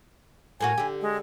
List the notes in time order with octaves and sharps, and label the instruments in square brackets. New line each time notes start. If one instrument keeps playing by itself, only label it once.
[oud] A2 A#3 F#4 [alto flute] G#5
[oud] D3 G4
[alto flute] G#3